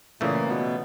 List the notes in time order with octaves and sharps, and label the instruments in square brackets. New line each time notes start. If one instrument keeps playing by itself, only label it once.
[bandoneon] A#2 A#3 [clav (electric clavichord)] C#3 E3 A3
[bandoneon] B2 B3